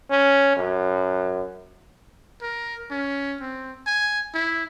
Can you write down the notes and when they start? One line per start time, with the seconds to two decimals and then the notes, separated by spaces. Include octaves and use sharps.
0.10 C#4
0.57 F#2
2.42 A#4
2.91 C#4
3.41 C4
3.87 G#5
4.34 E4